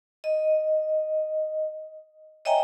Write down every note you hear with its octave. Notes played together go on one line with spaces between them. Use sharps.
D#5
C#5 D#5 E5 G5 G#5 A#5